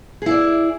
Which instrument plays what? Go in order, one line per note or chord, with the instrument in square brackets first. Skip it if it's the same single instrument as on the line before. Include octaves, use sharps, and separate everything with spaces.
[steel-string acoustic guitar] G#4
E4
D5